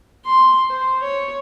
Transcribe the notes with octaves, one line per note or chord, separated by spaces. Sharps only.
C6
C5
C#5